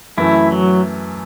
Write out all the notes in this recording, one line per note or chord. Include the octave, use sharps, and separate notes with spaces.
F#2 E3 A3 E4
F#3